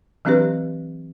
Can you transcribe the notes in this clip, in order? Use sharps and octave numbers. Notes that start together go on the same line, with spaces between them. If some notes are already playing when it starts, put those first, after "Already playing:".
E3 F#3 C4 D4 G4 B4